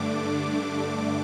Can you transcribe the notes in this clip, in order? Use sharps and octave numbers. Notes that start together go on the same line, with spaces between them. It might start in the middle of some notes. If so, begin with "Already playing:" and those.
Already playing: G2 D3 A3 D4 D6